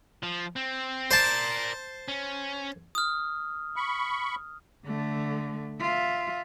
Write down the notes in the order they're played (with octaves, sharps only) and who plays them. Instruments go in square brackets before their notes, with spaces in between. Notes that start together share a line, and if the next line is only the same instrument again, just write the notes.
[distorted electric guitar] F3
C4
[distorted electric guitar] A#4 D5 [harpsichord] C5 A5
[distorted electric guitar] C#4
[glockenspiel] D#6 F6
[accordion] B5 C#6
[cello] D3 A3
F4 E5